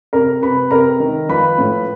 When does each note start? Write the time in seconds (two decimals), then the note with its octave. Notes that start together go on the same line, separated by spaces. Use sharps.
0.13 C3 A#4 A#5
0.42 C3 B4 B5
0.71 C3 A#4 A#5
1.00 D#3
1.29 F3 B4 B5
1.58 A2